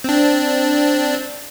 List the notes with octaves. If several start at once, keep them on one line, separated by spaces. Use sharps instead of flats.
C4 D4